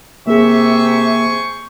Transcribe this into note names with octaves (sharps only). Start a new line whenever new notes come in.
C3 A#3 G#4 C5 E5 G#5 C#6